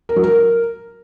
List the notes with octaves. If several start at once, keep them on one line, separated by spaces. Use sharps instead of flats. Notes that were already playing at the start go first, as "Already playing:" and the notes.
A#4
F#3
A#4